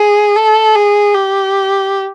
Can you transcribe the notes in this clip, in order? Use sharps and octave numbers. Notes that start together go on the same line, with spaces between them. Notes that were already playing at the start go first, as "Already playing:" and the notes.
Already playing: G#4
A4
G#4
G4